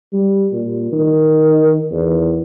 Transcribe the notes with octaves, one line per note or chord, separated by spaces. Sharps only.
G3
A#2
D#3
E2